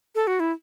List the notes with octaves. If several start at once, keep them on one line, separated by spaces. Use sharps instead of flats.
A4
F#4
E4